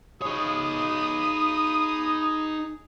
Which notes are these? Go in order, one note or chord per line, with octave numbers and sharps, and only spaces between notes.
D#4 G#4 C#5 B5 D#6